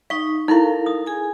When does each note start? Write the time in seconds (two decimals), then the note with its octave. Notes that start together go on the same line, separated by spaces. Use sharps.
0.10 D#4 F5 C#6
0.48 D#4 E4 A4 A#4 F5
0.86 D#6
1.06 G#4 G#5